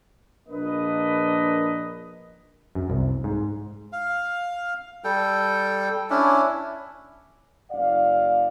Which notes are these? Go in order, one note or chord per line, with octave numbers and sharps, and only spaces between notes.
A#1 A#3 D4 A#4 B4 D#5
F#2
C2
G#2
F5
G3 A4 G5
C#4 D4 E4
F#1 D5 F5